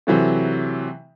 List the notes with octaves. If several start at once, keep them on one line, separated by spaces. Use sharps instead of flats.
C3 E3 F#3 A3